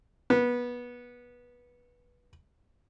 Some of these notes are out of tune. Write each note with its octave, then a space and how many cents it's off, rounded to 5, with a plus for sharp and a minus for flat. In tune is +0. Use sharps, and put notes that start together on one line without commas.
B3 -20